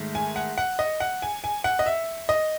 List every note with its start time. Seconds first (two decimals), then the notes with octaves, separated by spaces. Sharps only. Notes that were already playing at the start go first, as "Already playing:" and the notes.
Already playing: G#2 D#3 A3
0.15 G#5
0.36 F#5
0.58 F#5
0.79 D#5
1.00 F#5
1.22 G#5
1.44 G#5
1.64 F#5
1.79 D#5
1.86 E5
2.29 D#5